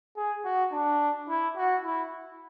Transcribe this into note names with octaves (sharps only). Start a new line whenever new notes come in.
G#4
F#4
D4
E4
F#4
E4